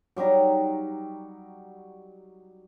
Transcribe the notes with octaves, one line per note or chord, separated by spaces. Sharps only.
F#3 G3 D#4 A#5